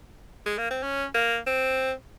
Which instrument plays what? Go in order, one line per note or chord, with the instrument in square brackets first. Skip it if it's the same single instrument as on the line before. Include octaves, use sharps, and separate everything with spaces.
[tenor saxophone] G#3
A#3
C4
C#4
A#3
C4